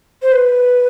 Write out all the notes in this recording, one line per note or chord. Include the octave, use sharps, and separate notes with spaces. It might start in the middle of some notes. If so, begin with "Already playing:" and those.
C5
B4